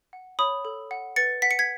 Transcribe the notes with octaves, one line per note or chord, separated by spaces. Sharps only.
F#5
C#5 B5 D#6
A4
F#5
B4 A6 C#7
F#5 B6
C#7
G#6 B6